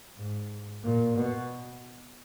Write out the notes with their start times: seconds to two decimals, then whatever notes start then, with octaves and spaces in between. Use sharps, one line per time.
0.16 G#2
0.83 A#2
1.17 B2